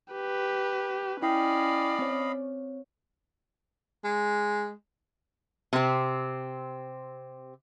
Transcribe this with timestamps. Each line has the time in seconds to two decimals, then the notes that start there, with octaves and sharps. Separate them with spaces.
0.11 G4 B4
1.22 C#4 E4 D5 D#5 F5 G5 B5
1.99 C4 C#5
4.04 G#3
5.73 C3 C4